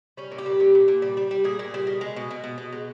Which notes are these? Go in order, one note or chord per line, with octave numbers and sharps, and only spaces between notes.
G3 C#4
A#2
G4
G3
A#2
A#2
A#2
G3
G3
G3
A#2 G#4
A#2
G3
B2
G#3
B2
B2
B2
B2
G#3